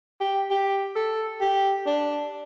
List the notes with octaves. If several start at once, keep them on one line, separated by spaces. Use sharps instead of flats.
G4
G4
A4
G4
D4